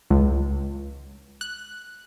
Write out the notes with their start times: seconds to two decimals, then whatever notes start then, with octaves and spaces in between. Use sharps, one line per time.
0.11 C#2
1.41 F#6